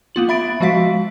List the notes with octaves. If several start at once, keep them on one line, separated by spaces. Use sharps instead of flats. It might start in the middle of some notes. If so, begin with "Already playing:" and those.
A#3 B3 F4 F#7
E5 B5 A6 D7
F3 G#3 F#4 F5 B6